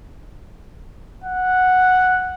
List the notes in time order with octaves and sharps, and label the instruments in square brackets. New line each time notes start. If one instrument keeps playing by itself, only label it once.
[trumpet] F#5